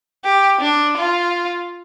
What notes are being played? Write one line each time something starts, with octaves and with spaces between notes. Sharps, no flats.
G4
D4
F4